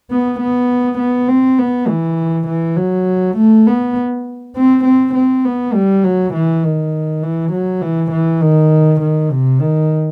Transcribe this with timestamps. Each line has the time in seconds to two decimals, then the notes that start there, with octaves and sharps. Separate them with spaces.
0.11 B3
0.40 B3
0.99 B3
1.29 C4
1.58 B3
1.88 E3
2.48 E3
2.77 F#3
3.37 A3
3.67 B3
4.56 C4
4.85 C4
5.15 C4
5.45 B3
5.74 G3
6.04 F#3
6.34 E3
6.64 D#3
7.23 E3
7.53 F#3
7.82 E3
8.12 E3
8.41 D#3
9.01 D#3
9.31 C3
9.61 D#3